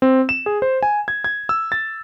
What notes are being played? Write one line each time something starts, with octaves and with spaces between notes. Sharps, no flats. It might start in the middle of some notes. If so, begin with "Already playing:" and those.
C4
E7
G#4
C5
G#5
G#6
G#6
E6
A6